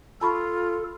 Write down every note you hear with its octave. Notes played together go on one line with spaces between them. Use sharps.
F4 A4 A5 B5 C#6